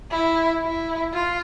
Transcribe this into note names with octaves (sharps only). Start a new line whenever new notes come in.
E4
E4
F4